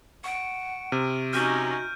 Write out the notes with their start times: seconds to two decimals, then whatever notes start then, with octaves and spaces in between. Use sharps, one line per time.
0.24 F#5 C#6 D7
0.92 C3 F6 D#7
1.33 C#4 D#4 F#4 F6 G6 D#7